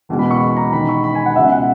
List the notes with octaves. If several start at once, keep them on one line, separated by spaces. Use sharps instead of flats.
F#1 E2 B2 G#3
B5
C#6
B5
A#5
E1 D#2 D#3 G#3 B5
C#6
B5
G#5
F#5
C#2 B2 G#3 C#4 E5
F#5